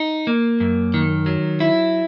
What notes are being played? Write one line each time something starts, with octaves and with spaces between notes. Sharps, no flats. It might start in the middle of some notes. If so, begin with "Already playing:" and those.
Already playing: D#4
A#3
F#2
D#3
F#3
E4